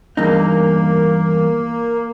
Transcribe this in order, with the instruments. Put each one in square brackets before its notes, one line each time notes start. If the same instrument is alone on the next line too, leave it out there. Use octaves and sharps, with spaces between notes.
[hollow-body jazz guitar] E2 G2 D#4 [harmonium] A#3